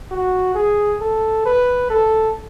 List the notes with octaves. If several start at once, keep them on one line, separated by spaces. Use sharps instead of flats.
F#4
G#4
A4
B4
A4